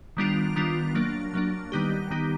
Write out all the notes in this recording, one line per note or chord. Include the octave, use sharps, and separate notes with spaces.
D#3 G3 B3 D4 F4
D#3 G3 B3 D4 F4
F#3 A#3 D4
F#3 A#3 D4
D#3 G3 B3 D#4 G4
D#3 G3 B3 D#4 G4